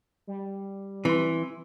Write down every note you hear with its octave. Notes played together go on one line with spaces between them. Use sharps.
G3
E3 C4 C6